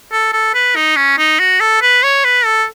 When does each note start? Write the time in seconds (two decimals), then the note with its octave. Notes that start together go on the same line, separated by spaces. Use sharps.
0.12 A4
0.33 A4
0.54 B4
0.76 D#4
0.96 C#4
1.18 D#4
1.39 F#4
1.60 A4
1.81 B4
2.03 C#5
2.24 B4
2.45 A4